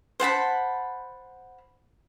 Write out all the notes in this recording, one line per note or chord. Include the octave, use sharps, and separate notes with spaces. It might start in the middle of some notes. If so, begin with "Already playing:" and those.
C5 F#5 A5 B5